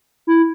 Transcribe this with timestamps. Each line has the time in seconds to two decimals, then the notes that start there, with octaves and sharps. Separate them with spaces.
0.27 E4